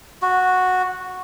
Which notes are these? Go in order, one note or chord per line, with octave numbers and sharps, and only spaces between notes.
F#4